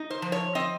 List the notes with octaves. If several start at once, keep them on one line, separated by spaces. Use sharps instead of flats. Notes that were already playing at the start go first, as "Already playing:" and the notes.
Already playing: D#4
C5
F3
C#5
C4 D#5